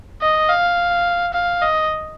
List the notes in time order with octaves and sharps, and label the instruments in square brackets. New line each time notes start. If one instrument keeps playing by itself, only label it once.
[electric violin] D#5
F5
F5
D#5